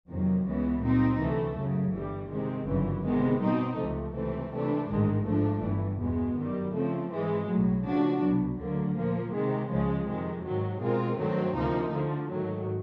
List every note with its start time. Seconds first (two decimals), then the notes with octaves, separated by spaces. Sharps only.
0.08 F2 C3 D#3 F#3 A#3
0.44 C#2 C#3 E3 G#3 B3
0.82 A#2 G3 C4 D#4
1.19 D2 C3 E3 A3
1.56 F#2 C#3 F#3
1.93 G1 G2 E3 G3
2.29 C3 D#3 G#3 C4
2.67 G1 F#2 C#3 E3
3.03 C3 D#3 G#3 B3
3.41 B2 G3 C4 D#4
3.77 C#2 C3 F3 A3
4.15 C#2 C3 E3 A3 C4
4.52 C3 E3 A3 D4
4.89 A1 G#2 D#3 G#3
5.26 G#2 F3 A3 D4
5.62 G1 G2 E3
6.00 E2 B2 G#3 B3
6.36 F#2 D#3 G3
6.74 C#3 F3 A3 C4
7.10 G#2 E3 G#3
7.47 B1 A2 F#3
7.85 C#3 F3 A3 D4 F#4
8.22 C2 B2 F#3
8.58 D2 D3 F#3 A#3
8.96 A#2 F3 A#3
9.33 C3 D#3 G#3
9.70 C#2 C#3 F3 G#3
10.07 F2 C3 D#3 G#3
10.44 G#2 D#3 F#3
10.81 B2 G#3 C4 F4 A#4
11.18 G2 D#3 F#3 A3 C4
11.55 D2 C3 F3 A#3 D#4
11.92 D3 F3 A3
12.29 G#2 D#3 F#3 A3